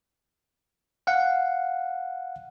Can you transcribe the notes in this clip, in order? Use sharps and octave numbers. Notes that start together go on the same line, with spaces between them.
F5 F#5